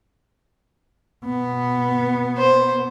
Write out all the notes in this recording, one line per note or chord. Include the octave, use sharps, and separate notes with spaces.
B2 B3
C5